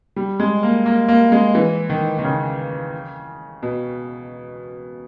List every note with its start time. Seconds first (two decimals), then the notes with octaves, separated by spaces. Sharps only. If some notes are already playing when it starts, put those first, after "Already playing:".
0.16 G3
0.40 G#3
0.63 A#3
0.86 A#3
1.08 A#3
1.32 G#3
1.55 E3
1.90 D#3
2.19 D#3
2.24 C#3
3.63 B2